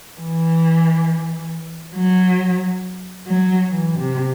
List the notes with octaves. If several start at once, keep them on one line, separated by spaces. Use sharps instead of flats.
E3
F#3
F#3
E3
C3